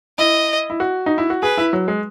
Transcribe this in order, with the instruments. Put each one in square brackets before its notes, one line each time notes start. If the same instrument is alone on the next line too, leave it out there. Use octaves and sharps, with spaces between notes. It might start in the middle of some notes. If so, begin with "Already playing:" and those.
[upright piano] E4 [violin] D#5
[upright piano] E4
F#4
D#4
E4
F#4
[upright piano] G#4 [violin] B4
[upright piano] E4
F#3
G#3